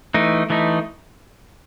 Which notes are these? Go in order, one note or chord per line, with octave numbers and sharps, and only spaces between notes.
E3 A3 D#4
E3 A3 D#4